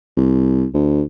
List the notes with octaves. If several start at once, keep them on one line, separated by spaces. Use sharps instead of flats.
C2
D2